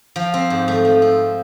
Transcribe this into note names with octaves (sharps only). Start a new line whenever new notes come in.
F3
C4
G#2
A3
F3
C4